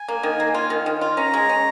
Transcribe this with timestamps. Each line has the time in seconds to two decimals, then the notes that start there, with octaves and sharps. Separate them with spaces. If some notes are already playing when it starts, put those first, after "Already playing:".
Already playing: G#5
0.08 A#3
0.23 D#3
0.40 A#3
0.54 F4
0.70 D#3
0.86 D#3
1.01 F4
1.17 C#4 A#5
1.34 G#3
1.49 C#4